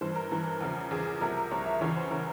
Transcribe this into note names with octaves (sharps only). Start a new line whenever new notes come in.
G2 E3 C5
A#4
G2 E3
E2 C#3 F3
E2 C#3 F3 G#4
G#4
C2 C3 F3 A#4
A#4
C2 C3 F3 C#5
E5
E2 C#3 E3 C#5
C5
C#3 E3 A#4